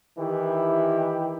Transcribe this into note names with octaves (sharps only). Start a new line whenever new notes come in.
D#3 E3 E4 G4